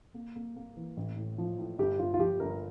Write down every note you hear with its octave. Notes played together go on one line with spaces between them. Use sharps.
A#3
A#3
A#3
E3
A1
A2
F3
A2
G1 G4
G1 F4
F4
F3 G4
G1 A#4